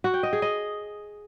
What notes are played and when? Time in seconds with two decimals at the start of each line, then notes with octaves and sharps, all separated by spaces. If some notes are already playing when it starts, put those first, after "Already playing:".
0.04 F#4
0.14 G5
0.23 D#5
0.33 G#4
0.42 D#5